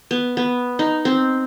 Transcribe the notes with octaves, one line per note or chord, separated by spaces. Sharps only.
B3
B3
D#4
C4